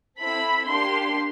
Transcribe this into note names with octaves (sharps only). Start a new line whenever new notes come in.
C4 E4 A4 B5
A#3 D4 G4 C6